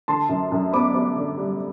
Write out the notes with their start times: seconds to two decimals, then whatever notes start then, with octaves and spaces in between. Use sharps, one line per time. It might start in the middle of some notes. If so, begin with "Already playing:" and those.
0.08 D3 A5 C6
0.29 F#2
0.52 F#2
0.72 B3 B5 D6
0.94 B3
1.16 D3
1.38 G3